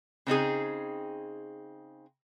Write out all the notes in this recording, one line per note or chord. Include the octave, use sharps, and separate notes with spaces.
C#3 C4 D#4 G#4